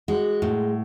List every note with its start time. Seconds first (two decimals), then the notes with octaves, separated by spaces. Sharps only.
0.08 G#3 F#4
0.42 A2